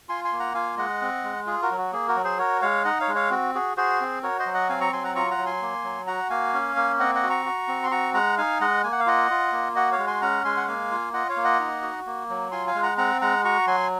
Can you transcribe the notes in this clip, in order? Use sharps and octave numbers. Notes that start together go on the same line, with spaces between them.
F4 G#5 C6
G#5 C6
A#3
F#5 A#5
F4 F5 G#5
G#3 D#5 F#5
C4
G#3
F4 G#4
F#4 A#4
F#3
F#4
A#3 G#4
F#4 A#4
F#3
G#4 C5
F#4 A#4 C#5
G#3 C#5 F5
D#4 D#5 F#5
C#5 F5
G#3
C#5 F5
C4 F#4
F#4 G#4
F#4 G#4 C5
C4
F#4 A#4 C#5
C5 D#5
F#3
D#5 F#5
C4 F5 G#5
A#5 C#6
F#3 G#5 C6
F#5 A#5
F4 A#5 C#6
F#5 A#5
F#3
G#5 C6
A#3
F#3
F#4 F#5 A#5
A#3 F5 G#5
C#4
A#3
C4 D#5 F#5
D#5 F#5
F#4
A#5 C#6
F#4
C4
C6
F#4 A#5 C#6
G#3 F#5 A#5
D#4 F5 G#5
G#3 D#5 F#5
A#3 G#5
F#5
F5
F4 D#5 F#5
F4
A#3
F#4 D#5 F#5
C#5 F5
G#3
G#5 C6
C#4 F#5 A#5
G#3 G#5 C6
F#5
A#3 F5 G#5
F4
F4 D#5 F#5
C#5 F5
A#3
D#5 F#5
D#4
F#4
A#3
F#3
F4 G#5 C6
F5 G#5
G#3
F#5 A#5
C4 F#5 A#5
G#3 F#5 A#5
F#4 A#5 C#6
F#3 G#5 C6